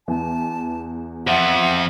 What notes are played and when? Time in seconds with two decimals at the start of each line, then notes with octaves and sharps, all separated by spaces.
0.08 E2 E3 A5
1.27 F2 F3 E5 F#5